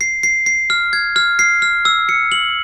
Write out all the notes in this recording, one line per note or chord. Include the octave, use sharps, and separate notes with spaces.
C7
C7
C7
F6
G#6
F6
C7
F6
E6
C#7
F#7